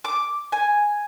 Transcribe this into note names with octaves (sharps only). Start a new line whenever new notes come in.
D6
G#5